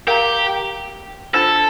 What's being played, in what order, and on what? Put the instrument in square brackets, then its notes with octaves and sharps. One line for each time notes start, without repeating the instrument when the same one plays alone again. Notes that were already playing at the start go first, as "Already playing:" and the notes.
[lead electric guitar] G4 [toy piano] A#4 F5 A#5
[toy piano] D4 F4 C5 [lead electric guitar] A4